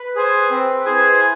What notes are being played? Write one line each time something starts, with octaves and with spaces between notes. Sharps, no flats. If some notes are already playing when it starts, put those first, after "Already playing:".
Already playing: B4
G#4 C5 G#5
C4
E4 G#4 C5 G#5